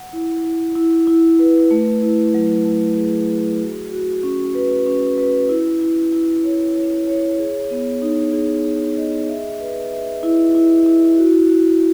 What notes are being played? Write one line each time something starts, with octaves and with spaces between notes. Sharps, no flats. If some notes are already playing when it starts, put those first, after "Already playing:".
Already playing: F#5
E4
E4
E4
E4
B4
A3
E4
F#3
A3
G#4
G#4
F#4
F#4
C#4
B4
C#4
B4
E4
E4
E4
C#5
C#5
C#5
G#4
B3
D#4
G#4
G#4
D#5
E5
B4
E5
E4
E4
E4
F#4
F#4